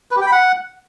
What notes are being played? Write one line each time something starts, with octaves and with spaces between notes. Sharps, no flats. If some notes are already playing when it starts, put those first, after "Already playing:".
B4
G4
G5
B5
F#5